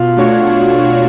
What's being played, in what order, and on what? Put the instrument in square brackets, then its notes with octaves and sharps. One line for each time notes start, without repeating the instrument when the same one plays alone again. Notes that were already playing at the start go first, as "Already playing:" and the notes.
Already playing: [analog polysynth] B2 [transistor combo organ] F4
[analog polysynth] A3 D4 F#4 C#5
B2